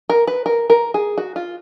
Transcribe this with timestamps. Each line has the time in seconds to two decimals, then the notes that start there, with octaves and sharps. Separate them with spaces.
0.09 A#4
0.27 B4
0.46 A#4
0.70 A#4
0.94 G#4
1.18 F#4
1.36 F4